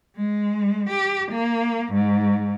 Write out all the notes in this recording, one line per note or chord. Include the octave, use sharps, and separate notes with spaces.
G#3
G4
A#3
G#2